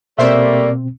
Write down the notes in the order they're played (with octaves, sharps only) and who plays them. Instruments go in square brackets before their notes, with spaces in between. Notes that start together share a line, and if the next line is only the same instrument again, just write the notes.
[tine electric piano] B2 C4 [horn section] G3 A3 A#3 [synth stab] C5 E5 [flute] D5